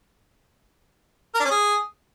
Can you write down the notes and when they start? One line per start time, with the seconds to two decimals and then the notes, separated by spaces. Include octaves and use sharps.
1.35 A#4
1.40 D4
1.45 C#4
1.51 G#4